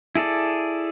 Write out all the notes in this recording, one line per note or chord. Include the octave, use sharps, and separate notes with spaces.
E4 G#4 A4 D5